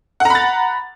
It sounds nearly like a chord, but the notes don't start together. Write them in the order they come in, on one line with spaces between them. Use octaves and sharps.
F#5 A#5 B5 A6